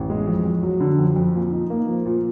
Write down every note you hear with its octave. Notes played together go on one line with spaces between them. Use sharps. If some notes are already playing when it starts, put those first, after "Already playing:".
Already playing: A1
G#3
F2
F2
F#3
D3
F2
F2
A#2
D#4
A#3
F3
A#2